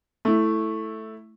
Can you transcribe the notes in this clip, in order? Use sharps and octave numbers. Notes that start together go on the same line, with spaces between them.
A3 E4